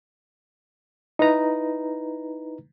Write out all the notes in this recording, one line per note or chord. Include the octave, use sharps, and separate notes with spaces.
D#4 E4 B4 A#5